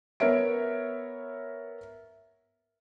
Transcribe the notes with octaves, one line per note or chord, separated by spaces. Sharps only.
B3 A#4 C#5 E5 D7